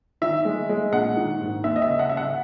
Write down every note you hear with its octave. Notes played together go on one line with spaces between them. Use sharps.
D#3 E5
G#3
G#3
A#1 F#5
D#3
G#2
D#2 E5
D#5
E5
C#3
F#5
C#3 E5
F#5